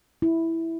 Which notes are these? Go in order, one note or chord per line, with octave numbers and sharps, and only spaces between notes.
E4